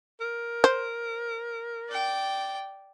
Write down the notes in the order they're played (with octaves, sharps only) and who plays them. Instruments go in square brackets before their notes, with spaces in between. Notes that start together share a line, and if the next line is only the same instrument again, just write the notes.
[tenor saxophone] A#4
[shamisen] C5
[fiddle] D5 G5